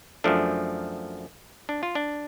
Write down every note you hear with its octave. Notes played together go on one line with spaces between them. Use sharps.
F#2 F3 A3 D4
D4
F4
D4